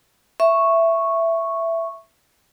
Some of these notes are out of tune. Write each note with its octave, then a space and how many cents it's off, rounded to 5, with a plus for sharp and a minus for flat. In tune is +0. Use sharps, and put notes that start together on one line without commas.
E5 +10 C#6 -5